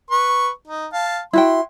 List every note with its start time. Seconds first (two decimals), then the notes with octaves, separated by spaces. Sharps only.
0.11 B4 C#6
0.68 D#4
0.93 F5 A5
1.33 E4 F#4 G5 C6